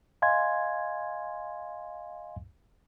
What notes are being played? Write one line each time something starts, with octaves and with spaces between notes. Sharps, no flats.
D#5 F5 G#5 C6 G#6